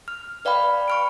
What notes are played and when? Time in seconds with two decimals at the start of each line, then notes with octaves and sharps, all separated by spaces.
0.08 F6
0.45 B4 D5 F5 G5 B5
0.88 C#6 F6 D7